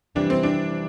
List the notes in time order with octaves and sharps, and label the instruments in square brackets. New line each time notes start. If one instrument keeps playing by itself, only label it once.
[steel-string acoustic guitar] F2 C3 E3 G3 [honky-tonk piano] D4
[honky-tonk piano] C4
D4